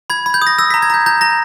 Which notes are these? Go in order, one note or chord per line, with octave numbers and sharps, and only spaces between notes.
B5 G#6
B5
G6
D#6
A#6
E6 A#6
B6
A#5
G#6
A#5 G6
A#5 G6
A#5 A#6